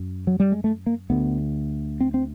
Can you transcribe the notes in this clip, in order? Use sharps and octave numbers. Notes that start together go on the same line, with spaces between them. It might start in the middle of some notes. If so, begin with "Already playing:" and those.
Already playing: F#2
F#3
G3
G#3
A3
A#3
D2 D3 B3
C4
C4